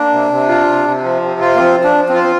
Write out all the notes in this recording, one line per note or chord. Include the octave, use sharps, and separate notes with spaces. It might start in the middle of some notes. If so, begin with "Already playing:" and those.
Already playing: A#3 D4
C3
C3
F4
C3
C3
F3
C3
F4
A#3
F3 C4
F3
D4
F3
C4
F4
C4